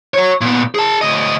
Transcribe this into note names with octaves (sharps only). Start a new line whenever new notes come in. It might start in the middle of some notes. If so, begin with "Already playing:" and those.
F#4 C#5
A#2 B3
G#4 A5
D2 D#5